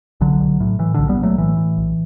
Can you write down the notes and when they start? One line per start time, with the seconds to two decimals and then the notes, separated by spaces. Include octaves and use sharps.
0.21 B1 D3 F#3
0.40 B1
0.60 A2
0.79 A2 E3
0.94 B1 D3
1.09 G3 B3
1.19 B1 F#3 A3
1.38 A2 E3
1.57 A2
1.78 B1